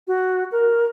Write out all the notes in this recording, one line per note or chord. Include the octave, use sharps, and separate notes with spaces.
F#4
A#4